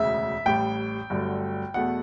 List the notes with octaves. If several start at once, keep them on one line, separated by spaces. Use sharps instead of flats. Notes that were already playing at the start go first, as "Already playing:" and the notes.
Already playing: E1 D2 C#3 E5
A1 A2 G3 G5
G1 G2 D3 F#3 A3
E2 B2 A3 F#5